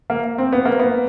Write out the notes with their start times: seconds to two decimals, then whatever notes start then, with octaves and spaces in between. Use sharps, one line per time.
0.10 A#3
0.38 C4
0.53 B3
0.65 A#3
0.79 B3